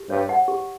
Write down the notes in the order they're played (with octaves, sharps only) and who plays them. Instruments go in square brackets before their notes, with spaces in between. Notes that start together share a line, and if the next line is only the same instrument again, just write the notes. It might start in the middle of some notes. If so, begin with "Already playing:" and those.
Already playing: [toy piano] G4
[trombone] G2 [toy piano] C#5
[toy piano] F#5
G4